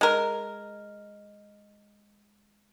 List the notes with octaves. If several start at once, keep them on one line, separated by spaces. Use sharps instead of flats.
G#3 A#4